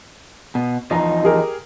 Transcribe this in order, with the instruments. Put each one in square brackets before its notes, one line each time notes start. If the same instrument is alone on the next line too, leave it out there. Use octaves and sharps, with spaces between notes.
[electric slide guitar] B2
[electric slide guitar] E2 F3 D#4 [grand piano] D#5 A#5
[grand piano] G4 G#4 A#4